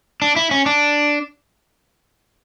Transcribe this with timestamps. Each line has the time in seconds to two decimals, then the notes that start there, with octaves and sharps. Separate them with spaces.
0.22 D4
0.36 E4
0.51 C#4
0.66 D4